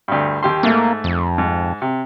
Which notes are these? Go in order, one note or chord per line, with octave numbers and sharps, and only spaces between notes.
D2 G2
D#2 G4 C6
G#2 A3 A#3
F2
G#2
C3